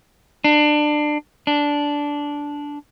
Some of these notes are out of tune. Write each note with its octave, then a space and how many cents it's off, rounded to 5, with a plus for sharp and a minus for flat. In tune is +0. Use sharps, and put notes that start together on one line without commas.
D4 +25
D4 -10